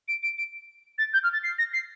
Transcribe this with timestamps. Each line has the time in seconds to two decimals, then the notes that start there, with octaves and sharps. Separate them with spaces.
0.08 D7
0.23 D7
0.38 D7
0.98 A6
1.13 G6
1.23 F6
1.33 A6
1.43 C7
1.58 A#6
1.73 C7